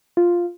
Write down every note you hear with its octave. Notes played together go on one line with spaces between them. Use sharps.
F4